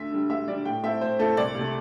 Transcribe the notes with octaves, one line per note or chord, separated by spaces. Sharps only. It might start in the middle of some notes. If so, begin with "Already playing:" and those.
Already playing: D2 E5
D3 G3
D2 E5
D3 G3 D5
A2 G5
A3 C4 E4 E5
A2 C5
A3 C4 E4 A4
C2 D5
C3 A3